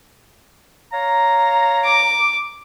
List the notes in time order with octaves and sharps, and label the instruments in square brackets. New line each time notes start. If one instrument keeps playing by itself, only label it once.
[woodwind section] C#5 F5 A#5
[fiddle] D6